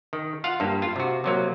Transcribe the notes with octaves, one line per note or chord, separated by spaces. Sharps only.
D#3
F4 F5 F#5
G2 A#3
F4
C3 F#4
C3 F#3 A#3